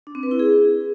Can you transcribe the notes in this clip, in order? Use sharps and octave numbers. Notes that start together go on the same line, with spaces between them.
D4
C4
B4
E4
G#4